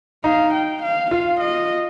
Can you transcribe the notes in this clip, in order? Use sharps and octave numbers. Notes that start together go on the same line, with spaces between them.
D#4 F5
G5
F5
F4 F5
D#5